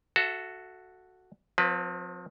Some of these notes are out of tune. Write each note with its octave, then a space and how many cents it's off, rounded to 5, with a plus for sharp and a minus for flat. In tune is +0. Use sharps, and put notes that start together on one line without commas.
F#4 +0 A4 +0 E5 +35
F3 +40 C4 +0 B4 +0